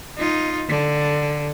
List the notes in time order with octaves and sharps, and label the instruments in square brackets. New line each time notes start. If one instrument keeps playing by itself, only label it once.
[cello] D#4 F4
D3